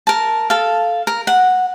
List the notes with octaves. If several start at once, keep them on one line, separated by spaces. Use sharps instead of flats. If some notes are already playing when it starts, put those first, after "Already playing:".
A#4 A5
A4 F5
A#4
F#5